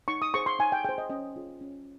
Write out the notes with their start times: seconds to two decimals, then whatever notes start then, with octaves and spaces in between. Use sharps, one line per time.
0.08 D#4 C#6
0.22 D#6
0.34 G#4 C5 C#6
0.46 C6
0.59 D#4 G#5
0.72 G5
0.85 G#4 C5 G5
0.98 D#5
1.10 C#4 D#5
1.36 F4 G#4
1.61 C#4